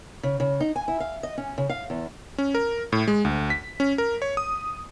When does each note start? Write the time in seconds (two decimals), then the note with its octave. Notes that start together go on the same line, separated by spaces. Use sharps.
0.23 C#3
0.40 C#3
0.60 D#4
0.76 G#5
0.88 E4
1.00 F5
1.23 D#5
1.38 C#4
1.58 C#3
1.70 F5
1.90 E2
2.38 C#4
2.55 A#4
2.92 A2
3.08 G#3
3.25 D2
3.50 B6
3.80 C#4
3.98 A#4
4.22 C#5
4.37 D#6